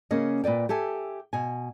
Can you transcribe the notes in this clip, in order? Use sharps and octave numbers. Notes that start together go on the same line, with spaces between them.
C#3 A#3 C#4 D#5
A#2 B4 D5 G5
G4 A4 E5 G#5
B2 G#5